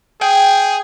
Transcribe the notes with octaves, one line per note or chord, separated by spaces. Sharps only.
G#4 G5